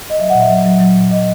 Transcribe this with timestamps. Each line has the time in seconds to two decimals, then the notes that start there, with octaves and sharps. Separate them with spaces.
0.10 D#5
0.19 F#3 E5
0.30 F#5
0.35 A#2
0.40 E5
0.49 F#3
0.66 F#3
0.80 F#3
0.97 A#2
1.11 A#2 D#5